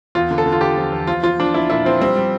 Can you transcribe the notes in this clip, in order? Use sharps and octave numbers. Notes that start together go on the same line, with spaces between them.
E2 F4
D3
A4
D3
F4
D3 G4
F3
E2
F3 F4
F3 F4
F3 D4
F3 E4
A#2 E4
F3 C4
G3 C4
G3